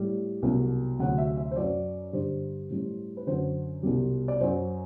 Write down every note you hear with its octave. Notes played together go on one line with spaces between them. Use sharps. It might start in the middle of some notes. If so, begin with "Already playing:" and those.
Already playing: A2 G3
C2 B2 F#3
D2 C3 F#3 F#5
E5
E5
C5
F#2 F#3 D5
G2 D3 G3 C5
A2 G3
B4
F#2 D3 F#3 C5
C2 B2 G3
D5
F#2 F#3 C5